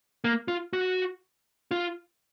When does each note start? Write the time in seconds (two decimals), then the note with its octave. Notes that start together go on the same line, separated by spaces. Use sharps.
0.24 A#3
0.48 F4
0.73 F#4
1.71 F4